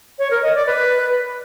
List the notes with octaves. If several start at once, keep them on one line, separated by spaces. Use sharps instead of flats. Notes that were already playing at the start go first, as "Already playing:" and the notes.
C#5
A#4
D#5
D5
B4